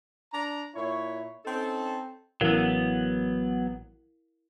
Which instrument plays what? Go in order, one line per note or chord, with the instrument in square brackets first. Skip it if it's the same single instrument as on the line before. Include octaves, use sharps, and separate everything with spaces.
[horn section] D4 A#5
A#2 E4 C#5
C4 C#4 D#4 A4
[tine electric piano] A1 [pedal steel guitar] F#3 B3 [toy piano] E4 A#4 F5